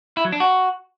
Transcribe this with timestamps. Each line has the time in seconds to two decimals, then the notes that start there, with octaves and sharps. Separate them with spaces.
0.17 E4
0.25 F#3
0.32 D4
0.40 F#4